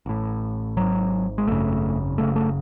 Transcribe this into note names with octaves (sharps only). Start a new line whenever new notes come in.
A1 A2
G#1 G#2 F#3
G#3
G#1 F#2 C#3 A3
F#1 F#2 C#3 A3
A3